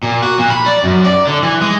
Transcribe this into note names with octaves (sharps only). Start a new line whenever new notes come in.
A#2
F#4
A#2
B5
D5
F#2
D5
D3
E3
G#3